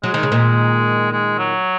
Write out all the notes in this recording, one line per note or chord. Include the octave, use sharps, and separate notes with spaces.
F#3 G#3
D#3
C#3
A#2 D#3
G#3
F#3